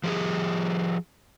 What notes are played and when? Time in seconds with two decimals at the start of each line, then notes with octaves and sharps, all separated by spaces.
0.04 F3 G4 G#4